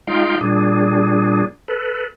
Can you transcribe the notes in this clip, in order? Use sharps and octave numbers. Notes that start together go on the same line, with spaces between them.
G#3 D#4 F4 F5 G5
A#2 G3 D4 G#4
A4 B4